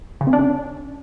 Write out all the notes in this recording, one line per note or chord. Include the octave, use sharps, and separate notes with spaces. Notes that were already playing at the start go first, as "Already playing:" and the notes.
C#3
C4
D4
C#4